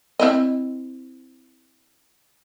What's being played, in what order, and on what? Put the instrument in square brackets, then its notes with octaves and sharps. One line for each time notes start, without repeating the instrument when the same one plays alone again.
[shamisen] C4 E4 D#5